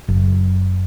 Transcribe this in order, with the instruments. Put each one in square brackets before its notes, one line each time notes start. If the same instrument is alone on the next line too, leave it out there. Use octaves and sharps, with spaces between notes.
[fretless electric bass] F#1